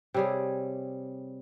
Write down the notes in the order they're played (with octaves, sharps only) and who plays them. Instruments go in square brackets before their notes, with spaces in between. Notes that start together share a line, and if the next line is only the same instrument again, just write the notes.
[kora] C3 G3 G#4 [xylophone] C#5 G5